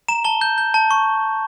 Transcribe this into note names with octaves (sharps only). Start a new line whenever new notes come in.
A#5 E7
A5 G7
G6
G6
A5
C#6